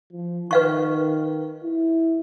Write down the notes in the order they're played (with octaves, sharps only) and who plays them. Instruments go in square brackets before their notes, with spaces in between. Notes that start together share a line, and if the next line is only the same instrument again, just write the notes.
[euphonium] F3
[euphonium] D#3 [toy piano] B4 F5 C#6
[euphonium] E4